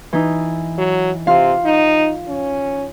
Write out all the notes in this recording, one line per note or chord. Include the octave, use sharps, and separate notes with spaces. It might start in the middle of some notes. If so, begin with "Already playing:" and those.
E3 D#4
F#3
C3 F4 F5
D#4
C#4